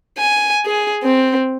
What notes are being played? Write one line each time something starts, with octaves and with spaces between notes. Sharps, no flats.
G#5
G#4
C4